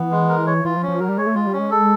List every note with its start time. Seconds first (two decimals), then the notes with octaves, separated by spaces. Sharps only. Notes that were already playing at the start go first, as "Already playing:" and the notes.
Already playing: E3 B3
0.11 G#3
0.29 A#4
0.47 C#5
0.64 E3 F4
0.77 F3
0.82 C#4
0.88 F3
1.00 F#3 A#4
1.09 G3
1.18 G#3 C#5
1.27 A3
1.35 G#3 F4
1.47 G3
1.53 C#4
1.59 G#3
1.71 A4